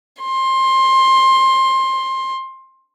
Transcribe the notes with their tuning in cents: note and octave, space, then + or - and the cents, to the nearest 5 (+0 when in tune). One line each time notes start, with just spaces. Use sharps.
C6 +20